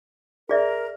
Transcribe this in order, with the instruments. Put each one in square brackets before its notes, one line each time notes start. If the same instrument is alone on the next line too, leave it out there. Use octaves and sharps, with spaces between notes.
[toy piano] G#4 D5 E5 [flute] A#4